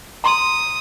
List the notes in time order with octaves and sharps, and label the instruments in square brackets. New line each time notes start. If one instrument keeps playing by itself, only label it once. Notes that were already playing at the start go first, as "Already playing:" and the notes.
[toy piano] A#5 C6 [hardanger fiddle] D#6